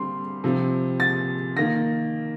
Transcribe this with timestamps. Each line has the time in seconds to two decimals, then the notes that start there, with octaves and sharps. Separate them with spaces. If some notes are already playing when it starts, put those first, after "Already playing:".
Already playing: D3 G3 C4 C6
0.44 C3 F3 C4
1.00 A6
1.57 D#3 A#3 A#6